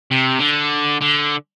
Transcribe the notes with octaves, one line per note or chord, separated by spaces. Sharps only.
C3
D3
D3